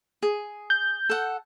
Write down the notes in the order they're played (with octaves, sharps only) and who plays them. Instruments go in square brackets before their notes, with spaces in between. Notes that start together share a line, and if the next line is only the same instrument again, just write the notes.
[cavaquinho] G#4
[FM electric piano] G6
[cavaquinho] A4 F#5